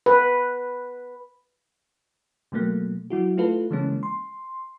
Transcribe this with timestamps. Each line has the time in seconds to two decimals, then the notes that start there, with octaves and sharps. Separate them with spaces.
0.06 B4
2.52 B2 F#3 A3 A#3
3.10 F#3 E4 F#4
3.37 A3 E4 F4 A4 B4
3.70 C#3 E3 G#3 A#3 C#4
4.03 C6